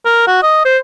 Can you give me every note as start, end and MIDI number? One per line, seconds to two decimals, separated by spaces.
0.05 0.24 70
0.27 0.41 66
0.43 0.63 75
0.65 0.78 72